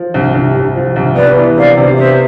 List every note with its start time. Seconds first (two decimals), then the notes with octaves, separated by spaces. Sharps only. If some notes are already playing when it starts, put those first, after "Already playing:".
Already playing: F3
0.14 C2
0.34 C2
0.55 C2
0.76 F3
0.96 C2
1.15 B3 B4 D5
1.36 E3
1.57 C3 D5 F5
1.77 C3
1.97 B3 C5 E5